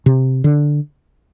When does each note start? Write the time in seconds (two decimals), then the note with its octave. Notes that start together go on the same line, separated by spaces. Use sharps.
0.06 C3
0.44 D3